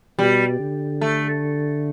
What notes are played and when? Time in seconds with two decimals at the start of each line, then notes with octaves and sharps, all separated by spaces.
0.18 B2 G3
0.60 D3
1.01 A3